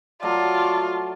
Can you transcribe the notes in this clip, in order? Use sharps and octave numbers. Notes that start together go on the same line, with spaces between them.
F#3 A3 F4 D5 A5